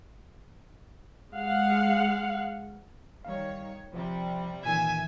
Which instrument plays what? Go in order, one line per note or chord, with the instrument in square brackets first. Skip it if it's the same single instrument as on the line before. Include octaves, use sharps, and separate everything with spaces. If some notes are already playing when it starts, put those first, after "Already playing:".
[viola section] G#3 F5 F#5
[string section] D#3 C#5 [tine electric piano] G3 F5
[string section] C3 G3 [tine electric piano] F3
[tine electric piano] A#2 D#3 E3 [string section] E5 [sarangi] G#5